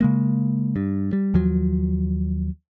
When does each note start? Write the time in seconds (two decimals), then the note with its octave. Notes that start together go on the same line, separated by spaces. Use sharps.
0.01 C#3 G#3 A#3
0.76 G2
1.13 G3
1.34 D#2 F3 F#3